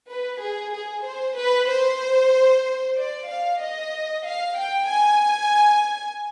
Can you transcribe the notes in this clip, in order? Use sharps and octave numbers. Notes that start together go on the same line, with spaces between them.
B4
G#4
G#4
C5
B4
C5
D5
F5
D#5
F5
G5
G#5